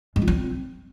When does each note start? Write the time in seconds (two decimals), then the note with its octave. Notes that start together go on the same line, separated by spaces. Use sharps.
0.16 G#3
0.22 F4
0.28 C4